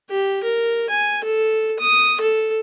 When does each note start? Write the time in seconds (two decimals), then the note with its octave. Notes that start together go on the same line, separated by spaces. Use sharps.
0.10 G4
0.43 A#4
0.90 G#5
1.24 A4
1.80 D#6
2.21 A4